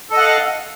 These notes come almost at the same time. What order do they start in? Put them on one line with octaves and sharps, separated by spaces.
A4 D#5 F#5 F5